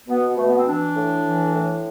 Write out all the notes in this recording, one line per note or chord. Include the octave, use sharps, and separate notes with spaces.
B2 B3
B2 A3
B3
C4
E3 D4
A2
E3
A2